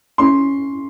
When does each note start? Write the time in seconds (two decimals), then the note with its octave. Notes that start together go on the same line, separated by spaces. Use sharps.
0.18 C#4 C6